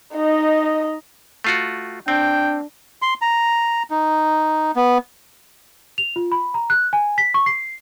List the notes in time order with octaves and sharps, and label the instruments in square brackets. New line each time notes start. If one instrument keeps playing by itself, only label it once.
[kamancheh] D#4 D#5
[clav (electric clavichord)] A3 F4 F#4
[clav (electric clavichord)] C4 [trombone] D4 [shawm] G5
[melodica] C6
A#5
D#4
B3
[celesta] F7
F4
B5
A#5
F#6
G#5
B6
C#6
C7